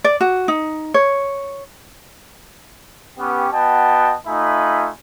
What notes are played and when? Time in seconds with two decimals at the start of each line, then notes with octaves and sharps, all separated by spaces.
0.04 D5
0.21 F#4
0.48 D#4
0.94 C#5
3.19 B3 C#4 G4
3.52 B3 F#4 D#5 G5 A5
4.27 A3 D#4 F4 E5 G#5 B5